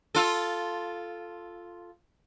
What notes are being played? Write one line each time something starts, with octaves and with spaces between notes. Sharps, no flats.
F4 A4